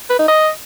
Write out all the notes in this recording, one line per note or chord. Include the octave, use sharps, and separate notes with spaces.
B4
D#4
D#5